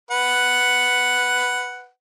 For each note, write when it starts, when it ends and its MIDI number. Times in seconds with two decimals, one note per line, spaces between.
0.11 1.89 71
0.11 1.89 78